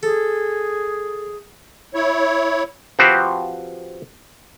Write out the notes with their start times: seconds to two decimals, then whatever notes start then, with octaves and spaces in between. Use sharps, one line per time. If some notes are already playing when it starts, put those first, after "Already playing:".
0.03 G#4 A4
1.94 E4 C#5
2.99 F3 C4 F#4 G4 B4 C5